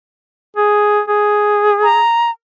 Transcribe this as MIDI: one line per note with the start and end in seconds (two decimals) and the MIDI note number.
0.57 1.00 68
1.08 2.04 68
1.83 2.30 82